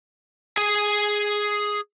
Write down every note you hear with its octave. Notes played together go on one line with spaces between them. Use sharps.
G#4 G#5